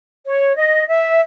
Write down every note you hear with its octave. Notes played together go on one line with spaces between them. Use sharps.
C#5
D#5
E5